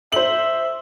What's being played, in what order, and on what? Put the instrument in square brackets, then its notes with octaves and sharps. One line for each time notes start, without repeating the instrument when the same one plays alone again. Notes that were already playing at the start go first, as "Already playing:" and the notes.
[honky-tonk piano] C5 F#7 [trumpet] E5